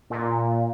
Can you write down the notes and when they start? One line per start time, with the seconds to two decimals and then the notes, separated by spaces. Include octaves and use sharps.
0.10 A#2